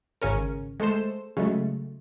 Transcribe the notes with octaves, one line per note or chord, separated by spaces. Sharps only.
G#1 C#3 C#4 A#4
G#3 A3 A4 C5 E7
C#3 F#3 G#3 A3